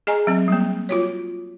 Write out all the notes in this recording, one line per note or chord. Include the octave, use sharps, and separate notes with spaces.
G#4 D#5 G#5 A#5
F#3 C4
G3 A#3
F4 F#4 C#5